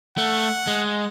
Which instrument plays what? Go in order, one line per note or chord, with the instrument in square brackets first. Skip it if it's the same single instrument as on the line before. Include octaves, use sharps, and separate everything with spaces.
[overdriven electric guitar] A3 [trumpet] F#5
[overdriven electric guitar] G#3